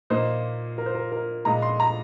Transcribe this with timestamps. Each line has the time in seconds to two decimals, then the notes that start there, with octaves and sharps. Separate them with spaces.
0.10 A#2 A#3 D#4 C5
0.78 A#4
0.86 C5
0.95 A#4
1.12 A#4
1.45 A#2 G#3 D#4 A#5
1.62 C6
1.80 A#5